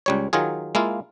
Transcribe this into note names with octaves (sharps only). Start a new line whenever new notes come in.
C#2 G3 C#5
D#3 F#3 F4 G#4
G#3 A#3 E4 F4